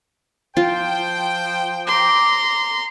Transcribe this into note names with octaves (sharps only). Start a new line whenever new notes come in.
F3 F4 C5 G5
A#5 C6 D6